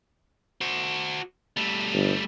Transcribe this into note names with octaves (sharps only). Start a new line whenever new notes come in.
F#4 C5
G3 A3
G1